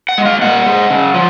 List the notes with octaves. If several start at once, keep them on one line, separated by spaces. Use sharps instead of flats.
F#5
G#3
F5
A#2 F#5
G#3
C#3
F3